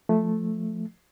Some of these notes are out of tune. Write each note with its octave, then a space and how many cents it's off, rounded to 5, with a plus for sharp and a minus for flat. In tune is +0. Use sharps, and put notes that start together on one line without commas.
F3 +0 A3 -5